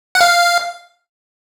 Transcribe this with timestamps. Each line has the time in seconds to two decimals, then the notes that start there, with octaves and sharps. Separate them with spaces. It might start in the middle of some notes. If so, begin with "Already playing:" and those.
0.15 F#5
0.21 F5